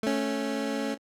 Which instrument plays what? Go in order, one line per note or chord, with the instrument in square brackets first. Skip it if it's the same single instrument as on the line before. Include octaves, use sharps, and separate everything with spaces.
[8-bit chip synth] A3 C#4